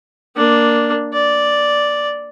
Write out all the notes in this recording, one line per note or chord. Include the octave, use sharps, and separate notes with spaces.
A#3 D4
D5